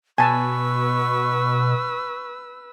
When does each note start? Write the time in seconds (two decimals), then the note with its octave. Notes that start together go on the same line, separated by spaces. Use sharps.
0.18 B2 B4 G#5 A5 C#6 E6